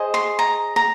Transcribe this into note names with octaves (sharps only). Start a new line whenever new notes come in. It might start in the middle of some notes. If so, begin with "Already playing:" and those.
Already playing: G#4 C5 D#5
C6
A#5
A#5